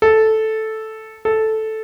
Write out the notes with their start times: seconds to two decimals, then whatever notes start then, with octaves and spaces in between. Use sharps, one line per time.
0.02 A4
1.25 A4